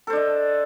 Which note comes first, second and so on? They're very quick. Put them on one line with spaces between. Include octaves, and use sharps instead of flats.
A4 C5 D4 D#5